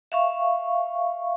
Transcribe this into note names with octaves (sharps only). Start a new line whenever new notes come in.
E5 F5 C#6